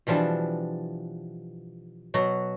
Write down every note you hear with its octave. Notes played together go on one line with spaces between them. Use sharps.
B2 E3 F3 G3 D4
B2 F#3 F#4